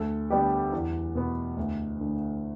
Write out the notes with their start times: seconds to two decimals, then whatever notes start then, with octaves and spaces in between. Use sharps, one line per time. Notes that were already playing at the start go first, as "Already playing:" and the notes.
Already playing: D2 A4
0.30 D3 G3 B3 G4
0.72 E2
1.15 B2 B3
1.57 D2
1.99 D3 A3